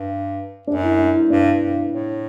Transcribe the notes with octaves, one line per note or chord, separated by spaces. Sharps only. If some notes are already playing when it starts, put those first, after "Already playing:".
Already playing: G2
F#2 D4
E4
D4
E4
G2 D4
G2
A2